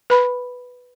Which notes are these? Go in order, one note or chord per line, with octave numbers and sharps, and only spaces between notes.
B4 B5